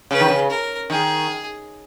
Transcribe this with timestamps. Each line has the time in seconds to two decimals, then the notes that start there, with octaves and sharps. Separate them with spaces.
0.11 C#3 B4
0.20 D#3
0.28 C#3
0.50 A#4
0.90 D#3 G#4